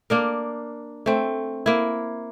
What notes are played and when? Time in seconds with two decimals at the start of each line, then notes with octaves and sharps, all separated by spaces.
0.10 A#3 D4 A#4
1.06 A3 C4
1.66 A#3 E4